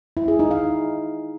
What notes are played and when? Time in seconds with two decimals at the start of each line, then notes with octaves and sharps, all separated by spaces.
0.17 E4
0.28 G#4
0.39 D#4
0.51 F5